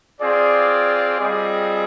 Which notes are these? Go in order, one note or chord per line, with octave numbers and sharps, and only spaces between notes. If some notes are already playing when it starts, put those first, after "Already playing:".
C4 F4 G#4 D5
G3 C4 F4 G#4 D#5